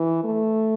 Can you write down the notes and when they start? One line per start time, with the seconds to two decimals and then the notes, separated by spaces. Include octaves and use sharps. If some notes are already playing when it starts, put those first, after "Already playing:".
Already playing: E3
0.24 A3